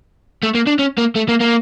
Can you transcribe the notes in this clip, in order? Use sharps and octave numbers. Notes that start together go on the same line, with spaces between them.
A3
A#3
D4
C#4
A#3
A3
A#3
A#3